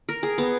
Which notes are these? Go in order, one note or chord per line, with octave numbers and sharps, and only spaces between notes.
A#4
G#4
B3